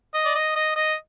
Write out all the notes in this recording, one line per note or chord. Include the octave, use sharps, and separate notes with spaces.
D#5
D5
D#5
D#5
D#5